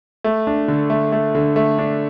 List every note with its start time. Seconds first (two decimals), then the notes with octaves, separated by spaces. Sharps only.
0.24 A3
0.47 D4
0.68 D3
0.90 A3
1.12 A3
1.35 D3
1.56 A3
1.79 D4